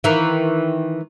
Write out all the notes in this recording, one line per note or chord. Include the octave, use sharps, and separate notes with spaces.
D#3 E3